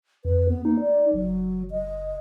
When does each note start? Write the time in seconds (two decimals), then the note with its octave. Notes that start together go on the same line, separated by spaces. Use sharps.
0.25 F2 B4
0.49 B3
0.65 A#3 D#4
0.80 D5
1.14 F#1 F#3
1.71 D#5